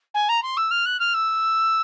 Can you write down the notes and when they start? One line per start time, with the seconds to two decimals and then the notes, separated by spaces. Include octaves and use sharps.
0.14 G#5
0.29 A#5
0.43 C6
0.57 E6
0.71 F6
0.86 F#6
1.00 F6
1.14 E6